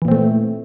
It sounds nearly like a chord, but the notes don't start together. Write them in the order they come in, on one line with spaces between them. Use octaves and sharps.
E3 A#2 C4 A3